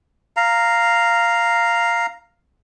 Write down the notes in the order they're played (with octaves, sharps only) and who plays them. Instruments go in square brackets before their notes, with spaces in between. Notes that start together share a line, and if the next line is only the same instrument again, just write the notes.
[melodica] F5 A#5